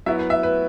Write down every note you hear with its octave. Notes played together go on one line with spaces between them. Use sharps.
F#3 B3 E4 E5
B4
E5
B4